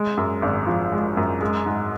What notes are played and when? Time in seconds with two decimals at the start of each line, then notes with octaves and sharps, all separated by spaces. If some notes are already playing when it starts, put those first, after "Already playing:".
Already playing: G#3
0.17 F#2
0.42 G#1
0.67 F3
0.92 G#3
1.17 F#2
1.41 G#3
1.66 G#2